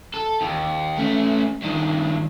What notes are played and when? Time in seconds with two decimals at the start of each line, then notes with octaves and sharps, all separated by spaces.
0.14 A4
0.41 D#2
0.98 A3 C#4
1.62 G2 D#3